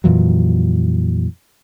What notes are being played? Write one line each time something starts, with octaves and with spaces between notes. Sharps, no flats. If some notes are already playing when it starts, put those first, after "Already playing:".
F2 A#2 E3 F#3